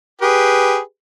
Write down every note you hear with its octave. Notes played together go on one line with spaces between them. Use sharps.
G4 G#4 B4